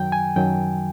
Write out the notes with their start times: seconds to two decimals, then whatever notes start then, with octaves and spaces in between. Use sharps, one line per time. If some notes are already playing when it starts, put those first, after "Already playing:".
Already playing: F#2 D#3 F#3 G5
0.12 G#5
0.36 F#2 D#3 F#3 G5